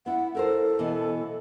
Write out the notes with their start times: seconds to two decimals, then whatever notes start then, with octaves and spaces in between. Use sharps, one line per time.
0.06 B3 E4 F#5
0.35 E4 A4 A#4 C5
0.79 B2 E3 B3